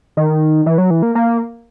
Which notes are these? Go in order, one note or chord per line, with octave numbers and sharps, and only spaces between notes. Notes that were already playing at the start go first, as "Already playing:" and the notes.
D#3
E3
F#3
E3
A#3
A#3